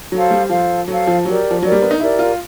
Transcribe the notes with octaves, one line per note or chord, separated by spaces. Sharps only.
F#3 A4 C5 F5
G3
F3 A4 C5 F5
F#3 A4 C5 F5
F3
F#3 G4 A#4 D5
F3
F#3 G4 A#4 D5
G3
B3
D#4
E4 G4 A#4 D5
F4